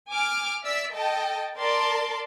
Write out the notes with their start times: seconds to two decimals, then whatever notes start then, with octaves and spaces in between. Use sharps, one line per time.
0.10 G#5 D6 F6
0.65 D5 E5 E6 B6
0.95 A4 D#5 G5 A5
1.57 A#4 D5 A5 C6